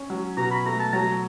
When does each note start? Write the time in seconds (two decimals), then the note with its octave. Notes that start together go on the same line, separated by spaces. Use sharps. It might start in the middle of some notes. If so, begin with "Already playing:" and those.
Already playing: C#4
0.10 F#3
0.37 B2 A#5
0.51 B5
0.66 A3 A#5
0.80 A5
0.93 F#3 A#5